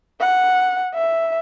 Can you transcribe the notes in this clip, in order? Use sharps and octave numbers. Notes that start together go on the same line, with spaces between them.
F#5
E5